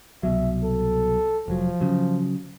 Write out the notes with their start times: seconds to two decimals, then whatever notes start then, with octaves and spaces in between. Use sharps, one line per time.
0.23 C2 B2 F#3 E5
0.64 A4
1.48 F1 F3 F#3
1.81 C#3 F#3